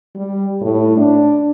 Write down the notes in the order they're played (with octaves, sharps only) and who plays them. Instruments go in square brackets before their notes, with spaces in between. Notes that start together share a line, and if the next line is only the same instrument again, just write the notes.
[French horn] G3
A2
D4